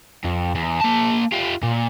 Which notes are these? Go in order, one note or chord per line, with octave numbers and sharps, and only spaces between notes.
F2
E2
A#3 A5
F4 G4
A#2